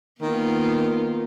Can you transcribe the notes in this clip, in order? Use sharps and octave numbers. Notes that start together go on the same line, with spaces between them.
D#3 A#3 B3 F4